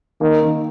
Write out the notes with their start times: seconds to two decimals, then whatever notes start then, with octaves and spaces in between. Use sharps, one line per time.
0.21 D#3 A#3
0.42 D#3